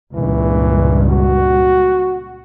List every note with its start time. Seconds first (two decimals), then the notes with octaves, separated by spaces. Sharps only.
0.15 C#2 G2 A#2 E3
1.10 F#4